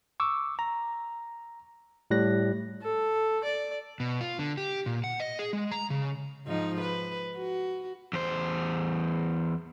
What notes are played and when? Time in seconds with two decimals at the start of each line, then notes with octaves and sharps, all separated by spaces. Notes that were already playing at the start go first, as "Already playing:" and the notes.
0.20 C#6 D6 E6
0.59 A#5
2.11 A2 G3 F#6 A#6
2.82 A4
3.44 D5
4.00 B2
4.21 F4
4.39 D3
4.58 G4
4.86 A#2
5.04 F#5
5.20 D#5
5.39 G#4
5.53 G#3
5.72 A#5
5.90 C#3
6.46 G#2 F3 D#4
6.81 B4
7.37 F#4
8.13 E2 C5